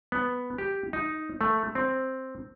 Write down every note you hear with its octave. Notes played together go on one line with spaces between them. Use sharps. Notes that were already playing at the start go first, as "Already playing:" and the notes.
B3
G4
D#4
A3
C4